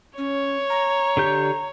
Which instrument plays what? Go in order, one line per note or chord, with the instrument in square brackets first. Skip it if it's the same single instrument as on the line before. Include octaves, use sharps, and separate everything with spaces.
[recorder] C#4 [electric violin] C#5
[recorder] A#5
[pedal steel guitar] D3 G4 G6